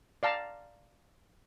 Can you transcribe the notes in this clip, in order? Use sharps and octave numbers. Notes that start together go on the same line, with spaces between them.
D5 F5 A5 A#5